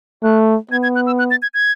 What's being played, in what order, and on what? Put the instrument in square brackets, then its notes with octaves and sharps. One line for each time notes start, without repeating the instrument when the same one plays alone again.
[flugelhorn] A3 [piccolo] F#6
[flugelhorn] B3 [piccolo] G#6
[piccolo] G#6
F#6
E6
F#6
A6
G#6
G#6